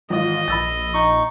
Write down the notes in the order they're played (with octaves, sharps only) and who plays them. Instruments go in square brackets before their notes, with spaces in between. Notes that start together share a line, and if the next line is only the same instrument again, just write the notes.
[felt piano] G#1 E3 [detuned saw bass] F4 [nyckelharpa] D#5
[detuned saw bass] A#1 [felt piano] B5 E6 A6
[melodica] D#4 C#6